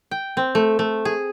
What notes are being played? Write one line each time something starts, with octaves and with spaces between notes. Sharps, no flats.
G5
C4
A3
A3
G#4